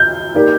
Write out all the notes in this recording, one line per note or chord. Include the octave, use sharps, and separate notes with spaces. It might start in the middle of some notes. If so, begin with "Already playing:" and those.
Already playing: G6
A#3 D#4 G4 D5